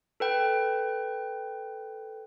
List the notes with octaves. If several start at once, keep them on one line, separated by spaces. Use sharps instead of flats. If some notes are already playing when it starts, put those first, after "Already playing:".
A4 B4 G5